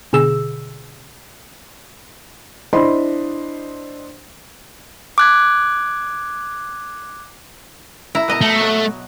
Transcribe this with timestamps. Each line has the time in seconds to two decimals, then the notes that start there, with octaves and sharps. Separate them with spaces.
0.13 B2 D3 G#4 E6
2.73 D4 E4 C5 D#5 B5 C6
5.18 D6 F#6 G#6
8.15 E4 A#5
8.28 B2 D#5 A#5
8.41 A3
8.60 F#3